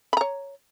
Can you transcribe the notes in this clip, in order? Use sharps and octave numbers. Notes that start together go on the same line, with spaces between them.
C#5 A#5 B5